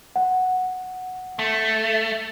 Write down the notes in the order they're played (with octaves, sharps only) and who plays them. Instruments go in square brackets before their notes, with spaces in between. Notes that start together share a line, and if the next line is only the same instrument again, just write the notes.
[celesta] F#5
[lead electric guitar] A3